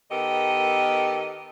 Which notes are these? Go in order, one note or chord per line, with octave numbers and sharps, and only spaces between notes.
D#3 B3 G4 A4 A#4 D#5